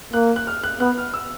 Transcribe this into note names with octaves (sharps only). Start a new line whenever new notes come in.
A#3 F#6
F#6
F6
F#6
B3 F#6
F6
E6